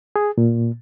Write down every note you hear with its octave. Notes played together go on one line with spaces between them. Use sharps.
G#4
A#2